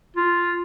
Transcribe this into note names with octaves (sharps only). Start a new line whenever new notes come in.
F4